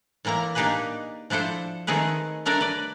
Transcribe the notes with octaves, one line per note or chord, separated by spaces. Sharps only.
A2 E3 A#3 E4 A#5
A#3 D4 D#4 G4 G#4 B4
F3 D4 E4 A4 C5
D#3 A3 C4 G#4 A#4 B4
G3 A3 D4 A#4 C#5 D5
B4 D5